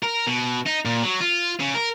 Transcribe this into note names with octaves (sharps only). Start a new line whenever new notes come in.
A#4
B2
D#4
A#2
F#3
F4
C#3
A#4